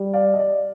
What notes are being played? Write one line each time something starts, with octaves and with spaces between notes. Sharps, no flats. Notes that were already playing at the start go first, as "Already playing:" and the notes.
Already playing: G3
D5 F5
D#5
D5